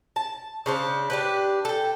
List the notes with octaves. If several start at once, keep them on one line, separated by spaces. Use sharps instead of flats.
A5
C#3 D4 C5
D4 G4 B4
A4 G5